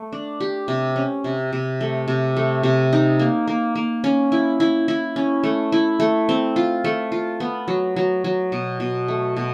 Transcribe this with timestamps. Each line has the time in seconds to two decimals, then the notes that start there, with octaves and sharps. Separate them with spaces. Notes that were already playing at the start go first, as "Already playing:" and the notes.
Already playing: A3
0.13 D4
0.41 G4
0.68 C3
0.96 C#4
1.24 C3
1.53 C3
1.81 A3
2.08 C3
2.36 A3
2.63 C3
2.93 D#4
3.19 A#3
3.48 A#3
3.76 A#3
4.04 C#4
4.32 E4
4.60 E4
4.88 E4
5.16 C#4
5.44 A3
5.72 E4
6.00 A3
6.29 C4
6.56 F4
6.84 A3
7.12 F4
7.40 B3
7.68 F#3
7.96 F#3
8.24 F#3
8.52 B2
8.80 B2
9.08 A3
9.37 B2